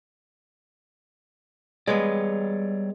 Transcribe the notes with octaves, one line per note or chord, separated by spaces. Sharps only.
G3 G#3 B3 C#5 D5